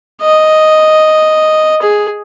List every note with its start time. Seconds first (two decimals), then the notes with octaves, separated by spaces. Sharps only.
0.21 D#5
1.82 G#4